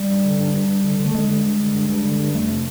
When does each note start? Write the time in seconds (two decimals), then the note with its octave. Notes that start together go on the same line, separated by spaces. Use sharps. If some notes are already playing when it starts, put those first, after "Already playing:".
Already playing: G3
0.10 G2
0.25 D3
0.40 G2
0.54 G2
0.69 G2
0.84 D3
1.00 D3 A3
1.14 D3 G#3
1.30 G2
1.45 G2
1.60 D3
1.75 G2
1.89 G2
2.05 D3
2.20 G2
2.34 F2 A3
2.49 C3